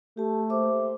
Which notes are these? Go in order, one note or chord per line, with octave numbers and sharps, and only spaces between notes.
A3 G4 A5
A#3 G4 C5 E5 D6